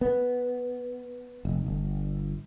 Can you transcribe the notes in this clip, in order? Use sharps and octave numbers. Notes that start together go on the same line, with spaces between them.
B3
F1
G1